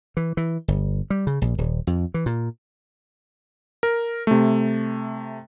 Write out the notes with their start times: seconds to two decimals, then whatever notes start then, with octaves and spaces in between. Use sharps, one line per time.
0.17 E3
0.37 E3
0.68 G1
1.10 G3
1.27 C#3
1.42 A#1
1.58 D#1
1.87 F2
2.14 E3
2.26 A#2
3.83 A#4
4.27 C3 A3